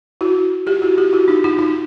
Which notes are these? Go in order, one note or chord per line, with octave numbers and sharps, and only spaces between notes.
E4 F#4
F4 G4
E4 F#4
F4 G4
E4 F#4
D#4 F4
D#4 F4
D#4 F4